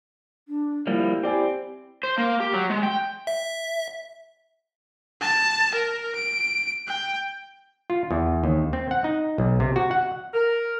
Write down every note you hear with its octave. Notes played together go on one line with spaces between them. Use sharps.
D4
F3 G3 A#3 E4
C4 G4 D5 G#5
C5
A#3
G4
F#3
G#3
G5
E5
A5
A#4
D7
G5
F4
E2
D#2
C4
F#5
D#4
B1
C3
F#4
F#5
A#4